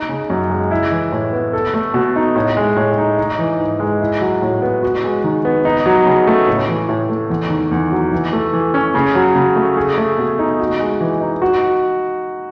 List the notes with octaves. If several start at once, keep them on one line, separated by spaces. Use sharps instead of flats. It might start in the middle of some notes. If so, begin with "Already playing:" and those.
Already playing: D#4
C#3
F#2
G#3
E4
E3
A2
B3
A4
A3
B2
D#4
A2
G#3
A2
D#4
D#4
E3
G#2
G#3
E4
F#3
A2
B3
F#4
G#3
D#3
B3
D#4
F#3
C#3
A3
A2
E3
A2
A3
E2
D#3
E2
F#3
E3
A3
E3
C#4
C#3
F#3
C#3
A3
G#4
A3
B2
D#4
F#4
G#3
E3
D#4
F#4